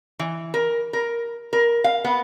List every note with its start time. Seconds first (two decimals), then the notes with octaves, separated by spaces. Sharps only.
0.19 E3
0.54 A#4
0.93 A#4
1.53 A#4
1.84 F5
2.04 B3